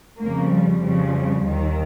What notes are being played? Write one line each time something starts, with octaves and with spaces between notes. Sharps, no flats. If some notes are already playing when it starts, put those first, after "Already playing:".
F2 C#3 F3 A#3
G3
F2 C#3 F3
D#2 D#3